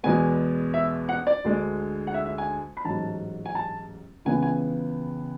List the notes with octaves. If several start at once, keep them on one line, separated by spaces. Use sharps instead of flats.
E2 B2 G#3 B3 G#5
E5
F#5
D5
D2 D3 G#3
F#5
E5
E5
G#5
B5
A1 G#2 F#3 A5
G#5
A5
C#2 C#3 E3 B3 G#5
G#5